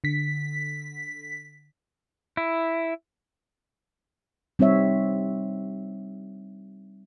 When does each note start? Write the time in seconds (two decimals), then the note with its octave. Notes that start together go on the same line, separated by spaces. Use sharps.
0.04 D3 B6
2.37 E4
4.59 G3 C4 D#4 C#5 E5